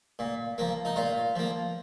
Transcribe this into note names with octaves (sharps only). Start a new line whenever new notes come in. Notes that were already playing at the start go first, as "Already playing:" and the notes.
A#2
F3 A#3
D#4
A#2 F4
F3 A#3